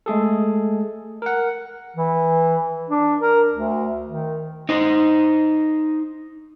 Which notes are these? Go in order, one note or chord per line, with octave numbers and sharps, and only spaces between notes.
G#3 A3 G#4 A4
A#4 F#5
E3
D4
A#4
D2
D#3
D#4 C5